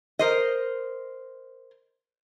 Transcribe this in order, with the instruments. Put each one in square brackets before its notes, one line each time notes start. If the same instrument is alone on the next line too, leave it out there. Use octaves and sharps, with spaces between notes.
[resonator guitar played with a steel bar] A#4 C5 D#5